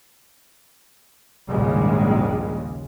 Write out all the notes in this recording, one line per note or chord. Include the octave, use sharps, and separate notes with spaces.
A#1 D#2 G#2 C#3 G3 G#3